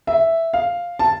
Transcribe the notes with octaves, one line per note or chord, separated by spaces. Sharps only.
E5
F5
A5